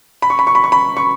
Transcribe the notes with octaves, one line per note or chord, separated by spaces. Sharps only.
B5
C#6
B5
C#6
B5
C#6
B5
C#6